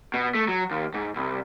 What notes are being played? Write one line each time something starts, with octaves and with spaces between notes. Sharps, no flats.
B2
A3
F#3
D#2
G#2
C2